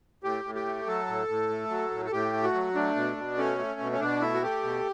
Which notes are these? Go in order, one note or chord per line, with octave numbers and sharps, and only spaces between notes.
A2 G4
A2
G4
A3
F#3 A4
A2
A2
A3
F#3
A2
A4
A2 G4
A3
F#4
F#3
A3 D4
B2
B2
A3 C#4
A3
B2
C#4
B2 D4
A3 E4
F#4
A3 G4
B2